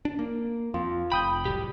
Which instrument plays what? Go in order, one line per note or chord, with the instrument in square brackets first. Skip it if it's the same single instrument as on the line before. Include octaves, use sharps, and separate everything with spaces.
[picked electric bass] D4
A#3
[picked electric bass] F2 [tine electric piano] F4
[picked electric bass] F1 [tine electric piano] G5 D#6 G6 [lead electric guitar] B5
[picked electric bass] D1 C2 [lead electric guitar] G4